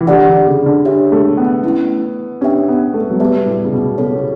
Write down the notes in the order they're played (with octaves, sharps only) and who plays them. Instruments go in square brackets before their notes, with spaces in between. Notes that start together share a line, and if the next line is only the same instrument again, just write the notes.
[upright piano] E3
[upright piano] D3 [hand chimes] G4 D5 F#5
[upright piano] D3
C#3
D3
[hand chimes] D4 G4 C#5 E5
[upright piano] A3
B3
[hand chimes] A3 C#4 E4
[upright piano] C#4 [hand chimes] D4 G4 B4 E5 G5
[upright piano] B3
A3
F#3
[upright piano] G3 [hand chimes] B3 F#4 B4 E5 A5
[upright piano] A2
C#3
B2
[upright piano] C#3 [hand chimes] B3 F#4 A4 C#5
[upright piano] C#3